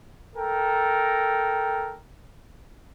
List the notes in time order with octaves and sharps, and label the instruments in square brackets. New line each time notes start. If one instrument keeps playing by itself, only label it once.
[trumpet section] A4 A#4 G5